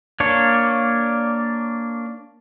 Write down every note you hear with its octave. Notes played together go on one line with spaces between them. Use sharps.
A#3 D4 C#5